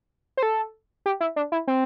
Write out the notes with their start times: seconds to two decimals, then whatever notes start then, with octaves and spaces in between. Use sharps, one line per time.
0.37 C5
0.43 A4
1.06 G4
1.21 E4
1.36 D4
1.52 E4
1.68 C4